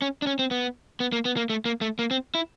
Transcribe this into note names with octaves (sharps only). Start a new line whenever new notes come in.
C#4
D4
C#4
C4
B3
B3
A#3
B3
A#3
A3
A#3
A3
A#3
C4
E4